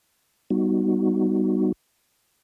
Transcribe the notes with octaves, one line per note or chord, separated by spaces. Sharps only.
G3 B3 D#4 F#4